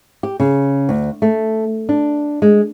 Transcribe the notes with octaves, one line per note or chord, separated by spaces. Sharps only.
G4
C#3
D2
A3
D4
G#3